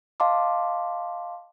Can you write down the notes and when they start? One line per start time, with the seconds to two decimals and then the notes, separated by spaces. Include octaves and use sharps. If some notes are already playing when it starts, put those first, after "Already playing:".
0.20 D#5 F5 A5 C6 D6